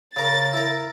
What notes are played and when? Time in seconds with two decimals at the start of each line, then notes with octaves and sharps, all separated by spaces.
0.16 C#3 A#4 A6
0.53 E4 A#4